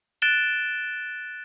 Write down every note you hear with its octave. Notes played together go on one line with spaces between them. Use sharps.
F#6 A6 D7 E7 G7